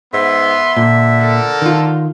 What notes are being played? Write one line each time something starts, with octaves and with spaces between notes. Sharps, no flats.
G#2 B3 E5 C6
A#2 D3
A4 A#4
D#3 F4